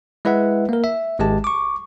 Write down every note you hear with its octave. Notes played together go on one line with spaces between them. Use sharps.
G#3 E4 B4 E5 F#5
A#3 A#4
E5
G#1 G#3 G4 A5
C#6 D6